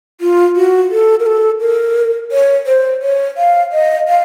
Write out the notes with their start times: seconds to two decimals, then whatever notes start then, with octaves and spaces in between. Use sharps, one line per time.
0.21 F4
0.56 F#4
0.91 A4
1.20 A#4
1.26 A4
1.60 A#4
2.32 C#5
2.67 C5
3.02 C#5
3.37 F5
3.72 D#5
4.08 F5